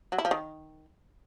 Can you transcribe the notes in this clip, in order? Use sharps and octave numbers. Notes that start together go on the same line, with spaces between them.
F#3
E4
F3
D#3